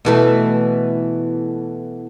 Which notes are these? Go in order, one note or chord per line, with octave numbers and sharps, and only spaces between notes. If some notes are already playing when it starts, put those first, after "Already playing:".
B2 E3 A3